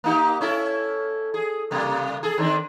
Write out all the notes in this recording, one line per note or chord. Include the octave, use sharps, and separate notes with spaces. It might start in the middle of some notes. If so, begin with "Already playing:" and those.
A#3 D#4 G4
C#4 E4 A4
G#4
C3 G3 A#3
G#4 A4
D#3 C4 D4